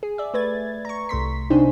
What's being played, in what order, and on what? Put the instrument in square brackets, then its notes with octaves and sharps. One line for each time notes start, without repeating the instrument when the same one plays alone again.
[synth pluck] G#4
D5 E5
A3 B4 G#6 A6
A#5 C#6
C2 A3 C6 B6
C3 D4 D#4 G#4 C5